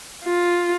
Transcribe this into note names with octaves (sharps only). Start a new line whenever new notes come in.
F4